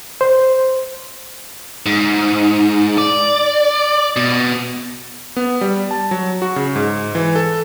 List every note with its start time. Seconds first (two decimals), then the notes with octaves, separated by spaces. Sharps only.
0.21 C5
1.86 G#2
2.98 D5
4.16 B2
5.37 B3
5.61 G3
5.91 A5
6.11 F#3
6.42 F#4
6.56 C#3
6.76 G#2
7.15 E3
7.36 A4